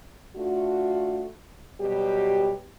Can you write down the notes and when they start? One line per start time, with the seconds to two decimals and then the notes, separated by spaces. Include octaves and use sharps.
0.36 A3 D4 F4 F#4
1.80 B2 F#3 G3 G4